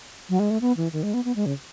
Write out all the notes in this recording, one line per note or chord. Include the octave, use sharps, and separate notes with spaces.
F#3
G#3
A3
B3
E3
D#3
G#3
B3
B3
G#3
C#3